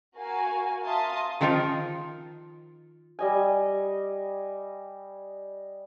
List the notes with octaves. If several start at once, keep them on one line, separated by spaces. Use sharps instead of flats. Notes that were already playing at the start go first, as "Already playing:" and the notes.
F#4 A#4 F5 G#5
E5 F5 A5 A#5 C6 D#6
D#3 F3 D#4 F4 A#4
G3 D#5 G#5